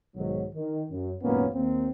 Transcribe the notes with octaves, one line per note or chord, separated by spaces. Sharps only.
B1 G#2 D#3 F#3
D#3
F#2
G#1 F#2 A#2 A#3 B3 C#4
D#2 A#3 C4